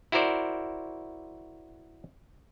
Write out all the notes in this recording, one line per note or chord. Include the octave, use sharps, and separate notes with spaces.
E4 F#4 A#4 C5 D5